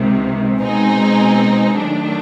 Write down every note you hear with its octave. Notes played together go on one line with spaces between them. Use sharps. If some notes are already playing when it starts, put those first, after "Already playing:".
Already playing: C#2 C3 D#3
B2 G#3 C4 D#4 G#4
D#3 F#3 A3 D4